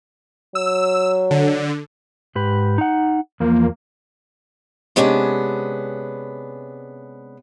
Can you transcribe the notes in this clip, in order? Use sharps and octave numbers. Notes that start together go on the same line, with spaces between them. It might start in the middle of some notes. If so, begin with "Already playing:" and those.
F#3 E6
D3
G#2 G4 B4
D#4 F#5
E2 F3 A#3
C3 G#3 B3 C#4 D4